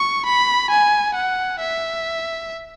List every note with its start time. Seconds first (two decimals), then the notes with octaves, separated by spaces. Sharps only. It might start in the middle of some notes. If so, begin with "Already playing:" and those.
Already playing: C#6
0.26 B5
0.71 G#5
1.15 F#5
1.60 E5